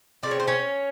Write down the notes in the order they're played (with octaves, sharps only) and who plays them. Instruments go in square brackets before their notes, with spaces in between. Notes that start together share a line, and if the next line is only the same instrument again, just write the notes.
[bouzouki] C#3 F3 A3 C4 D5
C#5
C5
C#4 C#5